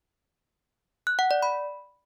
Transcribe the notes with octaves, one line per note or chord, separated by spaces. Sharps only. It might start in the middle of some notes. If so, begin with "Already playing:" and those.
F#6
F#5
D5
B5